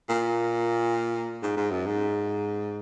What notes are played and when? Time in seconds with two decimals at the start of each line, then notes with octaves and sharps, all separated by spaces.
0.09 A#2
1.42 G#2
1.57 G#2
1.71 F#2
1.86 G#2